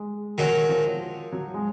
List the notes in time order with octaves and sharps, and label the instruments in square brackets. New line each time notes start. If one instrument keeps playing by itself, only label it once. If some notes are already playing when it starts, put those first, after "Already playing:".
Already playing: [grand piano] G#3
[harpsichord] D#3 F#3 C#4
[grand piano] F3
F#3
G#3